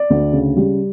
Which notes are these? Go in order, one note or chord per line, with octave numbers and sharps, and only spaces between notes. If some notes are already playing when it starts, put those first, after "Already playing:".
Already playing: D5
D2
C#3
G3